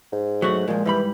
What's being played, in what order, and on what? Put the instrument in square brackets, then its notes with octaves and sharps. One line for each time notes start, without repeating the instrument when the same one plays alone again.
[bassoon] G#2
[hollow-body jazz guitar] F#3 A3 F#4
[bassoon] A#2 [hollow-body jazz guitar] F3 G#3
[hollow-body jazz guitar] G#2 G3 B5 [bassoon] E3